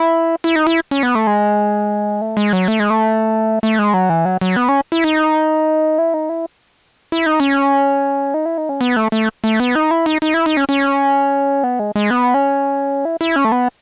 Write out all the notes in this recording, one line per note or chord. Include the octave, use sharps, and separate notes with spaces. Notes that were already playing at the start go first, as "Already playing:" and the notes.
Already playing: E4
E4
D#4
E4
C#4
B3
A3
G#3
A3
G#3
F#3
A3
G#3
A3
A3
G#3
F#3
E3
F#3
F#3
B3
C#4
E4
D#4
E4
D#4
E4
E4
D#4
C#4
D#4
E4
D#4
C#4
B3
A3
A3
A3
B3
D#4
E4
D#4
D#4
E4
D#4
C#4
C#4
B3
G#3
G#3
B3
C#4
E4
E4
C#4
A3
B3